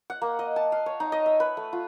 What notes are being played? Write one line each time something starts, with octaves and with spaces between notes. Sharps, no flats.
F#5
A#3
D#5
A5
F5
C#5
D#4
D#5
E5
B4
A3
F4